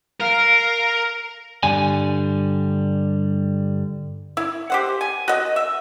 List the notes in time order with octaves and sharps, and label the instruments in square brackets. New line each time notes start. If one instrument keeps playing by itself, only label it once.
[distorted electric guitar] A#4 [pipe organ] F5
[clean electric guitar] G2 D3 G3 G#5
[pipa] E4
G4 C5 F#5
G#5
F#4 D#5
E5